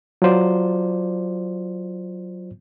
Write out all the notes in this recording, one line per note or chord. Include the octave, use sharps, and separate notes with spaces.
F#3 F4 C5 D5